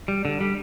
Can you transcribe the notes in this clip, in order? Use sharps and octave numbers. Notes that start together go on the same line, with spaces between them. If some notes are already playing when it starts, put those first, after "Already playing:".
G3
D3
G3